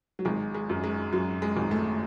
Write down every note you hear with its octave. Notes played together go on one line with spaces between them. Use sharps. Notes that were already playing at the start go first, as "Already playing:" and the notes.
F#3
G#1 G#3
G#3
F#2
G#3
F#2 F#3
G#3
G#1
A3